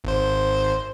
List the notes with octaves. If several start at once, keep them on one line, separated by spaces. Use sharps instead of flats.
G#1 C5